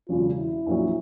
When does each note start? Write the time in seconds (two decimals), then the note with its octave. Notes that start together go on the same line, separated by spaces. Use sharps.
0.09 E1 E2 C#3 F#3 F4
0.38 E4
0.66 A#1 A#2 F#3